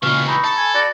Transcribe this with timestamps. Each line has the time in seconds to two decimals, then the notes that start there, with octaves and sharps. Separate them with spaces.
0.03 A#2 C#3 E3 G#3 F#4 F5 C#6
0.27 D#4 A#5 B5 E6
0.44 A4
0.57 G#5
0.75 F#4 D5